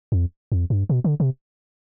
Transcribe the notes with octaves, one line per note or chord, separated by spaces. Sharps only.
F2
F2
G2
B2
D3
C3